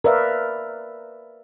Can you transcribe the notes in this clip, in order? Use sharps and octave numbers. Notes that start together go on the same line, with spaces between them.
A#4 B4 D5 E5 F5